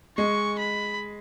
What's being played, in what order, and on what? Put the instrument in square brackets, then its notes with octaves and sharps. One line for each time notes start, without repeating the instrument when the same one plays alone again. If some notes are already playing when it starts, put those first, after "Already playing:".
[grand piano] G#3 [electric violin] C#6
[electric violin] B5